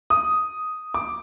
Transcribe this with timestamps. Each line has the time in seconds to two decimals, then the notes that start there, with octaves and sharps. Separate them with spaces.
0.10 D#6
0.94 D6